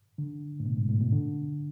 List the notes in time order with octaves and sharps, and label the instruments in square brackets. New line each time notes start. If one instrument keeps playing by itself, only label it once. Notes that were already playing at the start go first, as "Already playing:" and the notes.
[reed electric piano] D3
A2
B2
G#2
A2
B2
D3